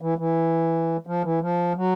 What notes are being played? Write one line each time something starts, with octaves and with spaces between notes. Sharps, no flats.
E3
E3
F3
E3
F3
F#3